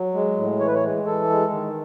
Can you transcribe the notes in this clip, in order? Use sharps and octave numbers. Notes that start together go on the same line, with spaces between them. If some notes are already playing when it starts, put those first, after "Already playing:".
Already playing: F#3
G#3
A2
E3 C#5
B4
C#5
G#3
E3 A4
G#3
D#3